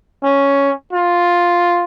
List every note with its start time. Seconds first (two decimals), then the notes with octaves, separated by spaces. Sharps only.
0.24 C#4
0.93 F4